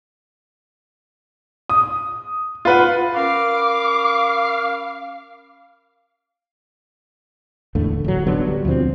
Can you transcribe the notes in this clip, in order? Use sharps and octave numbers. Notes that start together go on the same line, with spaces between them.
D#6
F4 B4 F#5
C#4 A#4 F5 B5 D6
E2 A2 D3 A3
D1 F#3
D3 F#3 B3
G3
D2 B2 F3 C4